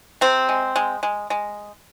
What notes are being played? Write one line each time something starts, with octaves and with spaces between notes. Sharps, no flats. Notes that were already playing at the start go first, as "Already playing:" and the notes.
C3 C4
G#3
G#3
G#3
G#3